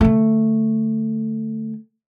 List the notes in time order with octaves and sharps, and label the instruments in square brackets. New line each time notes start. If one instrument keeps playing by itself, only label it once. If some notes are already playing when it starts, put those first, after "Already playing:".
[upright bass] D3 A3